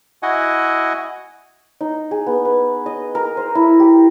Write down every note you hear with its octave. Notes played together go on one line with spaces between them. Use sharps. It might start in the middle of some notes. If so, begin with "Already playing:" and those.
E4 F#4 D#5 F#5 G#5
D#4
G#4
B3
B4
D#5
A#4
C5
E4
G4